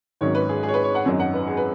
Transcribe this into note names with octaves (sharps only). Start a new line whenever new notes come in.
G#1 G#2 D#3 F#3 C#4 C#5
B4
G#4
G#4
C#5
B4
C#5
F#5
G#1 F#2 F#3 D#4
F#5
B4
G#4
B4